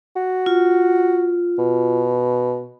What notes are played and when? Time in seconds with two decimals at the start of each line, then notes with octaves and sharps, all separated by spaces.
0.16 F#4
0.46 F4
1.58 B2